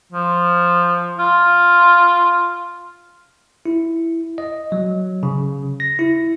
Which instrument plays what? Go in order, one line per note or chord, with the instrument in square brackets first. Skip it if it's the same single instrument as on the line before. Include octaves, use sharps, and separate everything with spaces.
[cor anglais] F3
F4
[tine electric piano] E4
D#5
F#3
C#3
A#6
E4